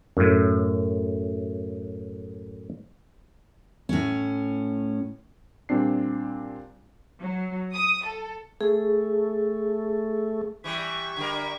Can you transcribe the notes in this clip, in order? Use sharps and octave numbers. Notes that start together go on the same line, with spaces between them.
F#2 A2
A2 C#4
A#2 G3 C4 D4 C7
F#3
D#6
A4
A3 G#4
E3 G3 E5 C#6
D3 G3 A#4